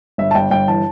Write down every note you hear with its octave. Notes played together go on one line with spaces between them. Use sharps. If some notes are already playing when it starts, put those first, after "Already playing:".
G1 E5
A5
G1 G5
G1 G5
E3 A5